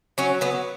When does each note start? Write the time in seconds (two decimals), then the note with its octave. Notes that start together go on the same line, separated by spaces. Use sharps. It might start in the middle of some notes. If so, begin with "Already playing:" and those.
0.18 F#3 C#4
0.41 F#3 B3